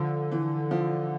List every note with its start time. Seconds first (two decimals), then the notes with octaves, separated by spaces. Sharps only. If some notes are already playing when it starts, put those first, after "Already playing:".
Already playing: D3 F3
0.32 E3
0.71 F3